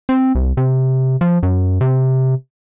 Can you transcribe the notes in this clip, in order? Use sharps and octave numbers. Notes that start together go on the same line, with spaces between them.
C4
C2
C3
F3
F#2
C3